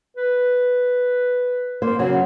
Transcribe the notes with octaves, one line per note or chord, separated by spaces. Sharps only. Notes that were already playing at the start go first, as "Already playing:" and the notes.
B4
A#3 C5
C#3 F#3